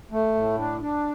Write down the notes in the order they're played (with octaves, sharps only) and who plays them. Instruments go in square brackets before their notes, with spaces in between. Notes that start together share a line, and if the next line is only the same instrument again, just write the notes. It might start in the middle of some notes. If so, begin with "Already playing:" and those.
[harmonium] A3
A2
D4
D4